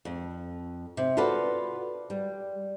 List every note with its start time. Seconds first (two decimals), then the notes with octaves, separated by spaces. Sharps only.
0.05 F2
0.97 C3
1.17 F4 F#4 A4 B4 D5
2.10 G3